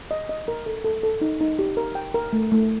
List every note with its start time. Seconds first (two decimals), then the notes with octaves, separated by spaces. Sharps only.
0.11 D#5
0.29 D#5
0.48 A#4
0.66 A4
0.84 A4
1.03 A4
1.21 D#4
1.41 D#4
1.59 G4
1.77 A#4
1.95 G5
2.14 A#4
2.33 A3
2.52 A3